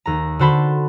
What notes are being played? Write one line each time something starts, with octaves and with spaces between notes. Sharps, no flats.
D#2 A#5
D3 D4 F#4 C5 A5 B5